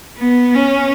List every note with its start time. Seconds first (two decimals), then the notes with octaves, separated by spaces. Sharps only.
0.17 B3
0.54 C#4